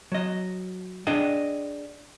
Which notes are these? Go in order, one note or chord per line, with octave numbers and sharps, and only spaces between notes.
F#3 D#5
D4 G#4 D5 D#5 G5